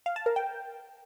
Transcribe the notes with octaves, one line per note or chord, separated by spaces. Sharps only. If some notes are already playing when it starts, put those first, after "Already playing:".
F5
A5
A#4
G5